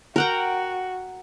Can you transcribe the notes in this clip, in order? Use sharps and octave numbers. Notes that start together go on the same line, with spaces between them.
F#4 A#4 F#5 G5